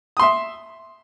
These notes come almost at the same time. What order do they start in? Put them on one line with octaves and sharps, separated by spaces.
D#6 C6 E5